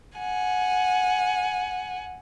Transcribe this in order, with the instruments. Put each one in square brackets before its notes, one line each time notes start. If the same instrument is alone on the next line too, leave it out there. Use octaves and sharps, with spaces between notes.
[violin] F#5 G#5